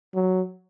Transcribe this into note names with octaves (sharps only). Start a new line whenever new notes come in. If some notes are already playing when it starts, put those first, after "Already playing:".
F#3